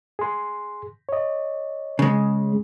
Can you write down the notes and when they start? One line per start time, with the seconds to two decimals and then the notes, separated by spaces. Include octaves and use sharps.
0.19 G#4 C6
1.09 C#5 D#5
1.99 C#3 G#3